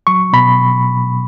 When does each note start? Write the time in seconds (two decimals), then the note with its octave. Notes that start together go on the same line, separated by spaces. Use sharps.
0.07 F#3 C#6
0.33 B2 B5